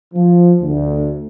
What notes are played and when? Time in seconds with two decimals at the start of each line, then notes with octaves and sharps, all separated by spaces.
0.14 F3
0.62 D2